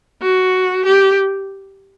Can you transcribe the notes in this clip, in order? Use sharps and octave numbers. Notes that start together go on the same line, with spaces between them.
F#4
G4